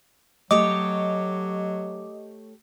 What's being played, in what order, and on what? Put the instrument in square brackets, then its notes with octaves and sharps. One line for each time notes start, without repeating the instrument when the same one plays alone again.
[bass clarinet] F#3 [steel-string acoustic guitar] A3 G4 C#5 [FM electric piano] D#5 [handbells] D6